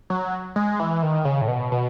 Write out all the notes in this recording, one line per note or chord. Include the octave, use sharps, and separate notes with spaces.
F#3
G#3
E3
D#3
C#3
A2
B2
B2